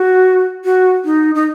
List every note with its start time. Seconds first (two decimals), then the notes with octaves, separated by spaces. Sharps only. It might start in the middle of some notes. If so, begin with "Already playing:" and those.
Already playing: F#4
0.65 F#4
1.05 D#4
1.35 D#4